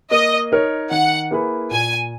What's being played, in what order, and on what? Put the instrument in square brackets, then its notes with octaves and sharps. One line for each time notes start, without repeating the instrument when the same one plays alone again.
[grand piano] A#3 [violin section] D#5
[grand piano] D#4 A#4 C#5
[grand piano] D#3 [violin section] F#5
[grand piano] A#3 E4 G#4 B4
[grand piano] A#2 [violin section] G#5